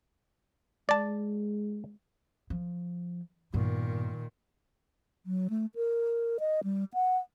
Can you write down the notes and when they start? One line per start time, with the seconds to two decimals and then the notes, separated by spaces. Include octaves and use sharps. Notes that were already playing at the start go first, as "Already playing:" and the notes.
0.89 G#3 D5 A5
2.50 F3
3.54 G2 A#2 D#3 B3
5.26 F#3
5.50 A3
5.75 A#4
6.40 D#5
6.64 G3
6.94 F#5